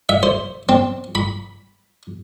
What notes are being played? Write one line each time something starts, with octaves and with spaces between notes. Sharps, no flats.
E5
C5
C4
B5